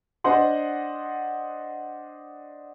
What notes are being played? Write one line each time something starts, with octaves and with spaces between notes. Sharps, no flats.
D4 C5 D#5 F#5 C6